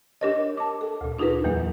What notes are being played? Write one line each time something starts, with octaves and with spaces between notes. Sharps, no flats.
D4 G4 A#4 C#5 D#5
A5 D6
A4
D2 A#2
D4 D#4 F4 G#4 A#4 B4
E2 E3 F#3 A#3